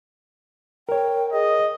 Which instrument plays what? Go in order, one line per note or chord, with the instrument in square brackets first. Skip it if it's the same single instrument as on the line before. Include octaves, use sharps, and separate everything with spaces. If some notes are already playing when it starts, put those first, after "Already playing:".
[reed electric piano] A#4 C#5 [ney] G5
[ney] G#4 [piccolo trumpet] D#5